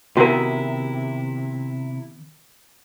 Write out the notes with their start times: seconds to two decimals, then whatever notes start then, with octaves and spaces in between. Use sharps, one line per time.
0.17 C3 D#3 B3 E4 F#4 A#4 A#5